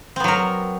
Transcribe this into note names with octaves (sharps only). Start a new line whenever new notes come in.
F#3 B3 C4 A#4